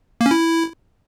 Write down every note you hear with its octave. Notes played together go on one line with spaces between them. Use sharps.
A#3
C#4
E4